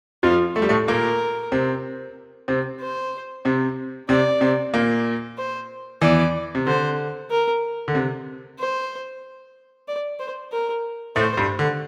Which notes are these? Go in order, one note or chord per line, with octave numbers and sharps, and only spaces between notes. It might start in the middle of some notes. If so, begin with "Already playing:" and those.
F2 F3 F4
A3 A4
G3
A2 A3
A#2 A#3 A#4
C3 C4
C3 C4
C5
C3 C4
C3 C4 D5
C3 C4
A#2 A#3
C5
E2 E3 D5
C3
D3 C5
A#4
D3
C3
C5
D5
C5
A#4
A2 A3 C5
G2 G3
D3